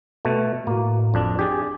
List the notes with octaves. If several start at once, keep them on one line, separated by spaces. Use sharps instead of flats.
B2 A3
A2 A#3 F#4
G1 F2 D4
D4 G4 G#4 D5